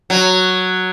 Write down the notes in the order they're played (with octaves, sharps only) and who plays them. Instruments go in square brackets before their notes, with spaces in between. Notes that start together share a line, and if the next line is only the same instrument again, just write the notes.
[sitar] F#3